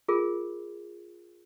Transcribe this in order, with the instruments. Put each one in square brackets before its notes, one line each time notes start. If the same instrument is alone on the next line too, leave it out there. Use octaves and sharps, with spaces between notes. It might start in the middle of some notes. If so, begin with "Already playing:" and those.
[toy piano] F4 G#4 A#4